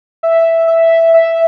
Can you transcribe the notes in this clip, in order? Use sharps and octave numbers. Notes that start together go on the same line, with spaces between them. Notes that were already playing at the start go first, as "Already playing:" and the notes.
E5
E5
E5